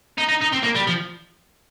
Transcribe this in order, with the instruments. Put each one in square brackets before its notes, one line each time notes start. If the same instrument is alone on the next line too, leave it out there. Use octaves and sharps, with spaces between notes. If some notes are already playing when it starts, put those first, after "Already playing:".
[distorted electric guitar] D#4
D#4
D#4
C4
A#3
G3
F3